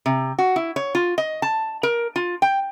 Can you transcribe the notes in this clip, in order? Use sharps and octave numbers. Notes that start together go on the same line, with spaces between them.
C3
F#4
E4
C#5
F4
D#5
A5
A#4
F4
G5